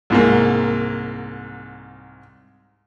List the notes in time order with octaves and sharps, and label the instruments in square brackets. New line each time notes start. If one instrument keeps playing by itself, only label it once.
[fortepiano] C2 G#2 A#3